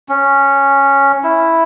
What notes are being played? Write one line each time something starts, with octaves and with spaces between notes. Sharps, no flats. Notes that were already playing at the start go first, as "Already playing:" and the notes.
C#4
E4